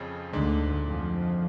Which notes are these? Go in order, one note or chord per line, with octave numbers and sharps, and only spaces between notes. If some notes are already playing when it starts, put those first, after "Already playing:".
Already playing: F2 C#3 F3
D2 G#2 D3 G#3 D4
F2 F3